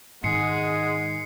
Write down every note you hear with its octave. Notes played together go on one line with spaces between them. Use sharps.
G#2 D#3 G#3 G#4 F#5 C7 C#7